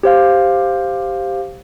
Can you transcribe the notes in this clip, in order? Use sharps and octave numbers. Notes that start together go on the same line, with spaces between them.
G4 C5 F5